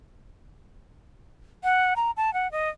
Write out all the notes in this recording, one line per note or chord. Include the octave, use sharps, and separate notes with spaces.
F#5
A#5
A5
F#5
D#5